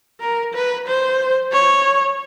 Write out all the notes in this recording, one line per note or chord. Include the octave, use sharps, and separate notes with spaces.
A#4
B4
C5
C#5